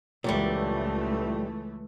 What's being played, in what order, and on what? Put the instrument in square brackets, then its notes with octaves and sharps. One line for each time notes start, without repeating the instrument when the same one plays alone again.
[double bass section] C#2 E3 A3 [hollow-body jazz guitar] A#2 F#3 G3